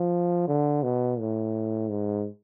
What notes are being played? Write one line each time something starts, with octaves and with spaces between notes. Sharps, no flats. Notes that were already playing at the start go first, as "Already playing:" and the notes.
Already playing: F3
D3
B2
A2
G#2